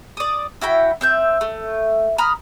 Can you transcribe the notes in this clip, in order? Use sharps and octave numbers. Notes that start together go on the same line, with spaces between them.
D5 D#6
E4 F#4 G5 B5
C4 E5 G6
A3
A#5 B5 D#6 F6